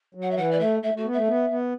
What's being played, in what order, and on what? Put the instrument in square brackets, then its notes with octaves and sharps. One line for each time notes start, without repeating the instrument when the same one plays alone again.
[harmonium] F#3
[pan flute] F#5
E5
[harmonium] E3 [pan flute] F#5
[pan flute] D5
[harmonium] A3 [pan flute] E5
[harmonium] A3 [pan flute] E5
[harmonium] A3 [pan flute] F#4
[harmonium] B3
[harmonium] A3 [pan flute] E5
[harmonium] B3
B3